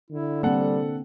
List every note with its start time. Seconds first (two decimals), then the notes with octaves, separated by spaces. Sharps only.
0.11 D3 E4
0.43 G3 A#3 C4 A4 F#5